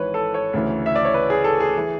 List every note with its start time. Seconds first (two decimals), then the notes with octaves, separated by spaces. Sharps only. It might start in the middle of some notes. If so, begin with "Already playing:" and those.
Already playing: G#1 G#2 E3 B4 C#5
0.14 A4
0.34 C#5
0.53 D2 C#3 E3
0.86 E5
0.96 D5
1.05 C#5
1.14 B4
1.30 G#4
1.44 A4
1.60 G#4
1.77 E3